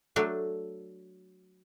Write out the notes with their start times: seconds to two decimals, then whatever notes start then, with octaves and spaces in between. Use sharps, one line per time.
0.16 F#3 A3 D4